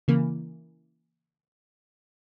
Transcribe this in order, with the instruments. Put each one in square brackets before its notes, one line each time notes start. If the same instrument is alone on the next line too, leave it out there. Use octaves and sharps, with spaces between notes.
[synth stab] C#3 E3 A#3